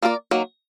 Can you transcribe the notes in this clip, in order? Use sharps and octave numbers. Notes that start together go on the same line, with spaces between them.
A#3 F4 A#4 D5
D#3 F#3 A#3